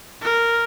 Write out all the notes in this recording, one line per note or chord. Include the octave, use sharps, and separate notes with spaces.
A#4